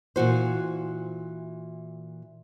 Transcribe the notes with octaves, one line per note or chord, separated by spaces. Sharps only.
A#2 E3 F#4 C5